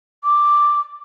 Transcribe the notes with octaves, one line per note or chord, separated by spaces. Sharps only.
D6